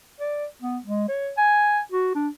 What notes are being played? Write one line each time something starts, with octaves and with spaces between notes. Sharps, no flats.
D5
B3
G#3
C#5
G#5
F#4
D4